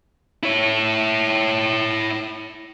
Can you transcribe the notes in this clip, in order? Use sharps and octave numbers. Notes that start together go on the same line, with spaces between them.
E4 C#5